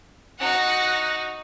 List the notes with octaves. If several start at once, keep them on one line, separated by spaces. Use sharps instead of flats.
D#4 F#4 F#5 A#6